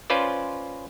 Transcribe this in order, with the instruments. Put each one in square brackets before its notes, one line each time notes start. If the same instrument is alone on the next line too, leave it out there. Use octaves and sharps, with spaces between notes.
[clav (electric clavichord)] C#4 F4 B4 C5 D5